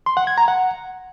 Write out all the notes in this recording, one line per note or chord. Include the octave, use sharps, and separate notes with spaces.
C6
F#5
G#6
A#5
F#5